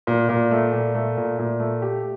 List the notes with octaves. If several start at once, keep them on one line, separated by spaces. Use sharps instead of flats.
A#2
A#2
A3
A#2
A3
A#2
A#2
A3
G4